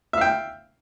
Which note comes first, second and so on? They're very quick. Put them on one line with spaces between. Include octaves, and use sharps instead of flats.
E5 F5 G5